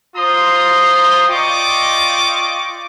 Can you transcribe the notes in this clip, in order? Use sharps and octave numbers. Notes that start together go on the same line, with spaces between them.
F4 C5 A#5 C6 D#6
F4 D5 D#5 G5 C#6 D6